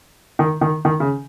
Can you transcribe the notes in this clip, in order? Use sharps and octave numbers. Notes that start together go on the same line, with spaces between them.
D#3
D#3
D#3
C#3